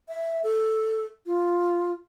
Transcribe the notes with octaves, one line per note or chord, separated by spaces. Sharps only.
E5
A4
F4